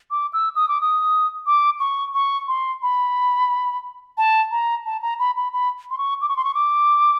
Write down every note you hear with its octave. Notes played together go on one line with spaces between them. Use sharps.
D6
E6
D#6
D6
D#6
D6
C#6
C#6
C6
B5
A5
A#5
A5
A#5
B5
B5
B5
C6
C#6
D6
C#6
C6
C#6
D6